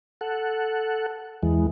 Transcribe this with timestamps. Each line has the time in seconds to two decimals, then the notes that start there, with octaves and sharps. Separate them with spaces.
0.21 A4 F#5
1.43 E2 E3 G#3